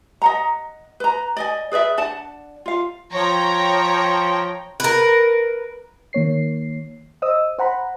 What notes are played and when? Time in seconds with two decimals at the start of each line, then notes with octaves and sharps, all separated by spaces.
0.22 D#5 F#5 A#5
1.00 B4 A#5
1.37 D5 D#5 G#5
1.72 G#4 B4 D5 E5
1.97 D4 D5 F#5 A5
2.66 F4 F5
3.13 F3 C#5 G5 A#5
4.80 A#4 B4
6.13 D#3 A#3 C#5 C7
7.22 C5 D#5 D#6 E6
7.59 C5 F#5 A#5 B5